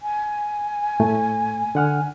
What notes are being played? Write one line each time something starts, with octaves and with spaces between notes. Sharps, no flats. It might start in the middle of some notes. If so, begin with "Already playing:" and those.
G#5
A2 A3
D3 F#5 F6